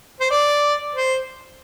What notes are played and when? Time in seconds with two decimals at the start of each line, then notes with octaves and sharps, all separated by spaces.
0.20 C5
0.30 D5
0.95 C5